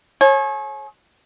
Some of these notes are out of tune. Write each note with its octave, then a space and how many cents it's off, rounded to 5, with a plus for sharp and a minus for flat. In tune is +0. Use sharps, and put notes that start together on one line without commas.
G#4 +35 C#5 -30